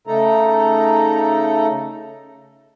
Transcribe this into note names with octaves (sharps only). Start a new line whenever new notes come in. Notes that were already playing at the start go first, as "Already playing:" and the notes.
C#3 A3 D#4 A4 A#5